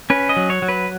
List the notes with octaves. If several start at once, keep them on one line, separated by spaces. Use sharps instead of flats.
C#4 B4
D#5
F#3
C#5
F#3
B4